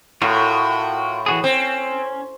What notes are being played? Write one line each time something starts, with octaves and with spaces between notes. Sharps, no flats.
A2 F4 F#4 A#4
E3 F#4 G#4
C4 C#4